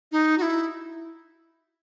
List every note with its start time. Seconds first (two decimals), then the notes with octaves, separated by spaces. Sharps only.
0.12 D#4
0.38 F#4
0.42 E4